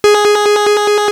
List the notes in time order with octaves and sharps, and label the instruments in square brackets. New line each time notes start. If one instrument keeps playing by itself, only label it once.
[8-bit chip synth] G#4